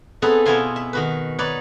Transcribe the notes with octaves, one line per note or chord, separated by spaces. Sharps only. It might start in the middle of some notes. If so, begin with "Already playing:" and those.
B3 C4 D#4 G#4 A4 B4
B2 B3 E4 F4 G#5 C6
E5
D#3 F#4 B4
D#4 B4 C#5 D5